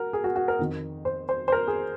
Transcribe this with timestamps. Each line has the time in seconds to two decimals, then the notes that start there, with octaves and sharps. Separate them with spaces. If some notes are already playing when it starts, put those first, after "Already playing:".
Already playing: F#4 A#4
0.13 G#4
0.24 F#4
0.36 F#4
0.48 A#4
0.59 F2 D#3
1.05 C5
1.29 C5
1.48 C5
1.52 A#4
1.67 G#4